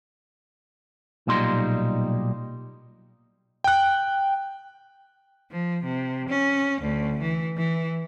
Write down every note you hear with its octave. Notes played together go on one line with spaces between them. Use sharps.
B1 A#2 G3 D#4 C6
G5 F#6
F3
C3
C#4
D2
E3
E3